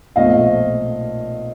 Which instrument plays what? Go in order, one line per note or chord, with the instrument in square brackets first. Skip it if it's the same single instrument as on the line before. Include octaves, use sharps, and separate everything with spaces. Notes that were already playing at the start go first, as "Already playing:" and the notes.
[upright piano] B1 A#2 F3 A3 C4 D#5 F5